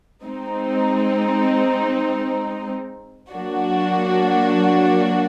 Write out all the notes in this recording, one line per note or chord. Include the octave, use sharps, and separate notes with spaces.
G#3 C4 D#4
F#3 A#3 D4 F#4